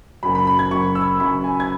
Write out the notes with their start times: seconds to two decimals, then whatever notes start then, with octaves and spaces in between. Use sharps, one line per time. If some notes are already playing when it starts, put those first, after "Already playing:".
0.23 F#1 F#2 F#3 B5
0.35 B5
0.47 B5
0.59 G#6
0.71 F#1 F#2 F#3 C#6
0.95 E6
1.19 F#1 F#2 F#3 B5
1.44 G#5
1.60 G#6